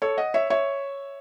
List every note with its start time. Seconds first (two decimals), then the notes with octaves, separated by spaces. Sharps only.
0.02 A4 C#5
0.18 D#5 F#5
0.34 C#5 E5
0.50 C#5 E5